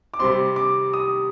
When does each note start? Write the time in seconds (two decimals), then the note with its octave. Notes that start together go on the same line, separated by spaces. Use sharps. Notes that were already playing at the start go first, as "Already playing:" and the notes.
0.14 D6
0.19 C3 G3 C4 C6
0.56 D6
0.93 D#6